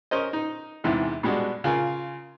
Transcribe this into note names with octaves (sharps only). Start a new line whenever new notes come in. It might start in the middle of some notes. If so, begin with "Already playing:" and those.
C#4 A#4 C5 D#5
D#4
E2 G#2 C3 E3
B2 G3 G#3 D4 F#4
C#3 F4 A#4 G#5